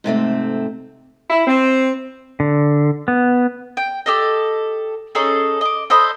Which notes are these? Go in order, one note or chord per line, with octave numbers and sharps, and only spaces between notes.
G#2 C3 A3 C4
E4
C4
D3
B3
G5
G4 A4 D#5
C#4 D#4 G#4 A4
D#5 D6
A4 C5 D#5 B5